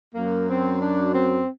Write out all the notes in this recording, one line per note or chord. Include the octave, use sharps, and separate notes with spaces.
F#2 F#3 A#3
C4
D4
C4